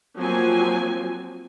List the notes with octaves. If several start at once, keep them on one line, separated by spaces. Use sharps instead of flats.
F3 F#3 A#3 C4 G#5